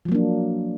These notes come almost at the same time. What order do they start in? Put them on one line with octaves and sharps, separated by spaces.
F3 F#3 A#3 D4